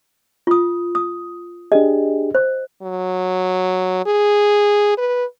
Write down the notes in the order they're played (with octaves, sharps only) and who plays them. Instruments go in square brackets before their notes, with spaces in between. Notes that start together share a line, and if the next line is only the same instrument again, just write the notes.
[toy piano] F4 D#6
D#6
[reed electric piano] D4 G4 G#4 [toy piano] D#5
[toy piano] C5
[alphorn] F#3
G#4
B4